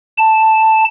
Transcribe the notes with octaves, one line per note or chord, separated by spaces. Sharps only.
A5